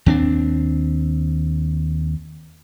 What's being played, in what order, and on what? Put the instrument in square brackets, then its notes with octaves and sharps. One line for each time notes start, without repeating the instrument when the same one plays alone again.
[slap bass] D#2 C4 D4